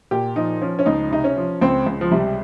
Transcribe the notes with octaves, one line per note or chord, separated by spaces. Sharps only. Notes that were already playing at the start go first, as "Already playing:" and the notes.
A#2 G4
F3 D#4
F3 C#4
C#4
C#2 D#4
C3 D#4
C#4
F3
C#2 C4
C#2
F3
C3 G3